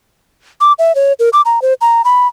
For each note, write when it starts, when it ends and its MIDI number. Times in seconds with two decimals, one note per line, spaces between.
0.61 0.72 86
0.79 0.95 76
0.95 1.13 73
1.20 1.29 70
1.33 1.41 86
1.45 1.62 82
1.62 1.73 72
1.81 2.02 82
2.05 2.28 83